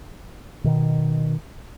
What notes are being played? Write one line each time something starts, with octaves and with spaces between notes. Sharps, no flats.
B2 D#3